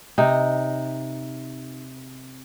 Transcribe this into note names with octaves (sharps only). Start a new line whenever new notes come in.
C3 D#4